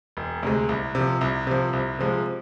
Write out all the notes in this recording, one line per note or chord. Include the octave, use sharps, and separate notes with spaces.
E1
D2 C3 G#3
C2
C3 F3
C2
C3 F3
C2
C3 F3 G#3